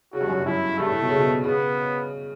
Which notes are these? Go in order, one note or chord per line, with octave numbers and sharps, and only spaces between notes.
C#3 F#4
G2
F#2
G2
F#2 E4
G2 A3
A2
B2
C#3
B2
C#3 B3